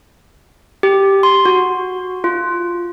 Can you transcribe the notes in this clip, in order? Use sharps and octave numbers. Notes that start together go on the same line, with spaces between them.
G4
C6
F#4
F4